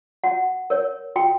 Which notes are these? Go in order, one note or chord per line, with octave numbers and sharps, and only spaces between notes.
F#4 F#5
A#4 C#5
F#4 G5